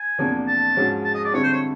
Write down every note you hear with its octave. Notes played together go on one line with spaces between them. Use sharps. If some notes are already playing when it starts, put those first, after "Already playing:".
Already playing: G#5
E2 C3 F3 A#3 D4
A5
G#2 F3 G#3 C#4 F#4
A5
D#5
D5
F2 D3 G3 C4 E4 C#5
C5
C#5